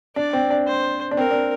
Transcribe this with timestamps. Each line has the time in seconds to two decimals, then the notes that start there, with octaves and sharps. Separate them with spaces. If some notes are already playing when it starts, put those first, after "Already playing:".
0.16 D4 D5
0.33 C4
0.50 D4
0.67 C5
1.11 D4
1.17 C4 A#4
1.31 D4